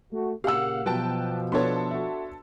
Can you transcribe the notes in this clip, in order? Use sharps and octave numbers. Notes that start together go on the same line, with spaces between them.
A3 F#4
A#2 C#3 A#3 G4 F5 F#5 E6
B2 F3 F#3 B4 G5 A5
B3 D4 A4 C#5 C6
F#4 E5